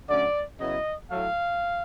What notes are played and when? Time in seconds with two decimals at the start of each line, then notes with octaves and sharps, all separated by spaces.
0.08 D3 F#3 A3 C#4 D5
0.59 C#3 F#3 B3 E4 D#5
1.10 A2 F#3 A3 F5